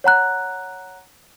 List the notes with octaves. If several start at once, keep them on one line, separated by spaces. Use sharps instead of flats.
C#5 F#5 A#5 F#6